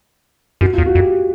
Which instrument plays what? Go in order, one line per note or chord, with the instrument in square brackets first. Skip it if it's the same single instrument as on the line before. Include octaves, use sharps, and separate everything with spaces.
[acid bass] F#2 [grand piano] F#4
[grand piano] F4
[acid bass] E2
[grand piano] F#4
[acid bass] F2
[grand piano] G4